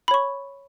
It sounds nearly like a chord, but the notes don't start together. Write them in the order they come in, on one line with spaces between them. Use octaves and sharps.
B5 C#5 C#6